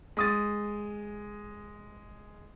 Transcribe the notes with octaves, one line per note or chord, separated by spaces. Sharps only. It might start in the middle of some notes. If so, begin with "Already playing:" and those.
G#3 D#6 A6